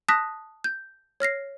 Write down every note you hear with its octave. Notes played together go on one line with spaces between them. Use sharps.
A5 D#6 F#6 A#6 B6
G6
C#5 F6 A#6 C7